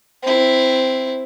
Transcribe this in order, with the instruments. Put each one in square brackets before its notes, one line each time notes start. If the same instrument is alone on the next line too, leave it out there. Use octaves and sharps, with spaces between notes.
[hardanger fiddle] C4 E4